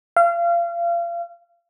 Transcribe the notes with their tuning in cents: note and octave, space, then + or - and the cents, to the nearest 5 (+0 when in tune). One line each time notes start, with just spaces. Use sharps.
F5 -30